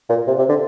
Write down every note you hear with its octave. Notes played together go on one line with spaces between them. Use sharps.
A#2
C3
C3
D3